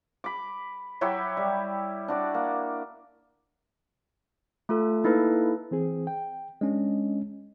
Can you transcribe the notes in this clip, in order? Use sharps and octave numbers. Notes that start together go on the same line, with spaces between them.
B5 D6
F#3 E4 G4 C#5
G3
D4 F#4 D5
A#3
A3 F4 A4
A#3 D#4 E4 A4 B4
E3 C4 G#4
G5
G#3 C#4 D4 D#5